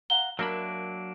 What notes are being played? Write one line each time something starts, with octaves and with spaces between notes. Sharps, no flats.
F5 F#5 A#5 G7
F#3 A#3 D4 A#4 E5 B5